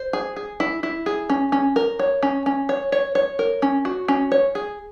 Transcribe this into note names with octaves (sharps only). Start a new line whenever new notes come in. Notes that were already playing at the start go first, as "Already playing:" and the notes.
Already playing: C5
G#4
G#4
E4
E4
G#4
C#4
C#4
A#4
C#5
C#4
C#4
C#5
C#5
C#5
A#4
C#4
F#4
C#4
C#5
G#4